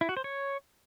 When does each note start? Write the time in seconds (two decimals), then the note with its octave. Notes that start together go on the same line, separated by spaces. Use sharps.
0.01 E4
0.09 F#4
0.17 C5
0.24 C#5